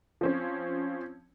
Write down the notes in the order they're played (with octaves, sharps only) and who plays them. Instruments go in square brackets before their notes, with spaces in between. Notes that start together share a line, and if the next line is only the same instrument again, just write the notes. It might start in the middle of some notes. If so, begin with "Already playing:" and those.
[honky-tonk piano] F3 C4 C#4